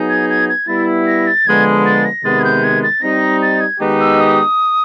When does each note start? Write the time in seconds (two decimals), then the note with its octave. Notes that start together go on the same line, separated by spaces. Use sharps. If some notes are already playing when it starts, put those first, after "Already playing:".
Already playing: F#3 B3 D#4 G#4
0.09 G#6
0.29 G#6
0.49 G#6
0.67 G3 B3 E4 A6
1.07 A#6
1.27 A6
1.46 D3 F3 G#3 B3 G#6
1.86 A6
2.05 A#6
2.24 C3 D#3 G#3 B3 A6
2.39 G#6
2.44 G6
2.64 G#6
2.83 A6
3.02 G3 C4 D#4 A#6
3.42 A6
3.61 G#6
3.80 D#3 G#3 B3 D#4 G4
4.00 E6
4.20 D#6